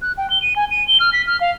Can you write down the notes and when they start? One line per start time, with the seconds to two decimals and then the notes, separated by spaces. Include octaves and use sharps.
0.02 F#6
0.18 G5
0.30 G7
0.42 D#7
0.56 G#5
0.71 D#7
0.88 G7
1.00 F6
1.13 B6
1.27 F6
1.41 F5